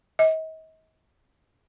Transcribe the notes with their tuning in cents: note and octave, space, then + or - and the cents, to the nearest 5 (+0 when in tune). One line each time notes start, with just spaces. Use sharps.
D#5 +40